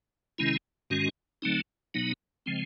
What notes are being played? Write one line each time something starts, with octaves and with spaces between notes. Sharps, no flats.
C3 D#3 G#3 C#4 E4
G#2 D#3 G#3 C#4 F#4
D3 F#3 A3 C4 D#4
B2 F#3 B3 D#4
C#3 F3 G#3 C4